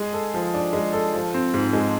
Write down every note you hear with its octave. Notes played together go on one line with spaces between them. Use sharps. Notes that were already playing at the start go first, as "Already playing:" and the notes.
Already playing: G#3 G#4
A4
F3
D4
G#3
A4
F3
C4
G#2
G#3